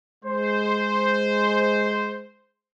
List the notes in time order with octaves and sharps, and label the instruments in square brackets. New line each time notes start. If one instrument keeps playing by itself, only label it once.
[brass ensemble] G#3 C5